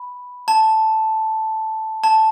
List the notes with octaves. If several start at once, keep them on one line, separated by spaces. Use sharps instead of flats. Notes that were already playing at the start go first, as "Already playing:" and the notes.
Already playing: B5
A5
A5